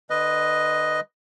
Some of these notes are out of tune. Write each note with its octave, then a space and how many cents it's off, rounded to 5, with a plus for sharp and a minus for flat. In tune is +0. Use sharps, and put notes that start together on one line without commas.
D3 +30 B4 +0 D#5 +0